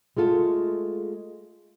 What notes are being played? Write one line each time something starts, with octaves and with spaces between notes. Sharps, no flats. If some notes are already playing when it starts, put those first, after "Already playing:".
G#3 A3 F4 A4